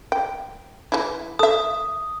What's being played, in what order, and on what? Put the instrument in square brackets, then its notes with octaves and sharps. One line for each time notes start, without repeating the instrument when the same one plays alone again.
[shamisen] G5
E3 D#4 E4
[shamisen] A4 E5 [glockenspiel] D#6